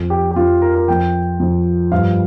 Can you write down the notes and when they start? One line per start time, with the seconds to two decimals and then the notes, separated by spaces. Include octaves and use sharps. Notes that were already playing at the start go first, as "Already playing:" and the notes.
Already playing: F2 F3
0.10 G4
0.31 G4
0.36 F2 F3 F4
0.62 A#4
0.75 A#4
0.88 F2 F3 G5
1.40 F2 F3
1.92 G2 F3 F5